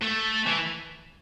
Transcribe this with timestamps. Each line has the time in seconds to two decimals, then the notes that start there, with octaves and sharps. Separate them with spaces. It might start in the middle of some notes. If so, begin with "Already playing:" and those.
0.02 A3
0.46 E3